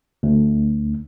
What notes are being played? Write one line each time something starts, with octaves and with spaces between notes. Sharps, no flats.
D2